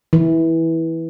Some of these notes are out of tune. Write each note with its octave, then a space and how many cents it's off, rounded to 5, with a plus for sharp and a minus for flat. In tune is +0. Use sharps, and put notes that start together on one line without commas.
E3 -15